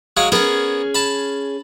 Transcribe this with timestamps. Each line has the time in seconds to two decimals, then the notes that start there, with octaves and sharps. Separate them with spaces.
0.17 F#3 G#3 F5
0.32 B3 C#4 G#4 A#4
0.94 A5 B5